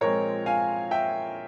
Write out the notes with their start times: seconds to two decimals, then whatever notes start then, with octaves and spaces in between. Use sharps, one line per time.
0.01 A#2 F3 G#3 C4 A#4 C#5
0.46 F5 G#5
0.91 E5 G5